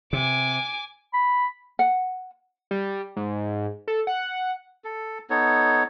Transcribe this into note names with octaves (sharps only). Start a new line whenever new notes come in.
C3 G#5 D6
B5
F#5
G3
G#2
A4
F#5
A4
B3 D#4 A4 C#5